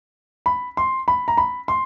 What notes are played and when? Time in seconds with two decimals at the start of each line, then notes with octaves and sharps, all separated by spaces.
0.46 B5
0.77 C6
1.08 B5
1.28 A#5
1.38 B5
1.68 C6